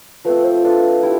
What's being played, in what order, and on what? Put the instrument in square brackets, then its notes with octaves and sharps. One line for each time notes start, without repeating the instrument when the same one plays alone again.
[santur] F3 A3 C4 [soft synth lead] B4
[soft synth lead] C5
[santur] D4 F4 A4 [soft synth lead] B4
[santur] E4 G4